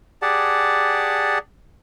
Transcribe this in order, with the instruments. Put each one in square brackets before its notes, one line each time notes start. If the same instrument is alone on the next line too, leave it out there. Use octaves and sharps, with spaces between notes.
[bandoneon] G4 G#4 D5 F#5 A5